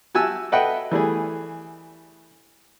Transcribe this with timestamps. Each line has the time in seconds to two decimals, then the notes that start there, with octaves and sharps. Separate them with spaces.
0.15 F#4 G4 G#5 A5 E6
0.52 A4 B4 D#5 E5 F#5 G5
0.92 E3 G3 A3 G#4